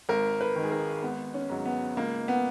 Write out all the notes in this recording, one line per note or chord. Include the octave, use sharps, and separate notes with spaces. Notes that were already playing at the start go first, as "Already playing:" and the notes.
G#1 A#4
B4
G#2 D#3
G#4
A#4
G#1 B3
C#4
G#2 F#3
B3
C#2 A#3
B3